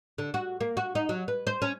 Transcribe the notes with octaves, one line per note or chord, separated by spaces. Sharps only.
D3
F#4
A#3
F#4
D#4
F#3
B4
C5
C#4